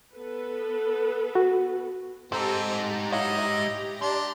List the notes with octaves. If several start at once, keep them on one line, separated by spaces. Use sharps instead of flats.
B3 A4 B4
F#4
G#2 C4 D#4 G4 A4 A#5
F#3 E4 D#5 F5
E4
D4 C6